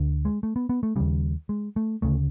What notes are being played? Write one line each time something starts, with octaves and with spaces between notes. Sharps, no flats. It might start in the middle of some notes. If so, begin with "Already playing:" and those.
Already playing: D2 D3
G#3
A3
B3
B3
A3
D#2 C#3 G3
G#3
A3
D2 C#3 A3